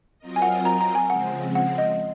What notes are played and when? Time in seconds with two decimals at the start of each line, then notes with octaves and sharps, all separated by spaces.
0.19 F#3 C4 F4 A#4 D#5
0.36 G#5
0.42 F#5
0.65 A#5
0.81 A#5
0.95 G#5
1.10 C#3 F3 G#3 C4 F#5
1.55 F#5
1.78 D#5